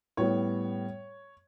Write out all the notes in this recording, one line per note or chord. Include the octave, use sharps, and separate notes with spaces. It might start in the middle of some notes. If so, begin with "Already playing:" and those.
A2 G3 B3 C#5